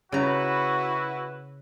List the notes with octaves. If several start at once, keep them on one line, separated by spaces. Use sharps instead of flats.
C#3 E4 F#4 B4 A#5